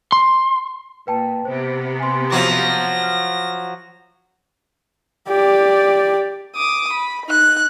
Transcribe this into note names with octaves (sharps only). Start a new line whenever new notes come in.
C6
A#2 B4 G5 A5
C3 B3 C5
G#5 C6
F3 F#3 A#6
F6
G4 D5
D6 D#6
B5
D#4 F#6